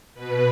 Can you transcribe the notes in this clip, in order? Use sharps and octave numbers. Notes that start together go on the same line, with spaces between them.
B2 B4